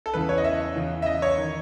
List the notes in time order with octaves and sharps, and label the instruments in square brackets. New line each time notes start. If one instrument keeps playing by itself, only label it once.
[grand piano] A4
E2 C#3 E3 B4
C#5
D#5
E5
E2 C#3 E3
E5
D#5
C#5
D#3